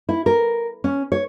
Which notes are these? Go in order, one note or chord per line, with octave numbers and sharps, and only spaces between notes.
E4
A#4
C#4
C#5